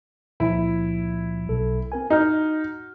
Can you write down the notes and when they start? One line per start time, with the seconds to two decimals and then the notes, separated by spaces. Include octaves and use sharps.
0.40 C#2 A#2 F3 E4
1.48 B1 A4
1.92 C4 A#4 G#5
2.10 D#4 F#4 F6